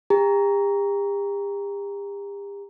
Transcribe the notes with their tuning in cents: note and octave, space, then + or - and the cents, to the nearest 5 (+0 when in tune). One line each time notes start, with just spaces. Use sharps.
G4 +40 A#5 +0